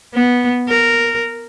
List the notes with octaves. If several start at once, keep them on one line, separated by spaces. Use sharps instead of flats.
B3
A#4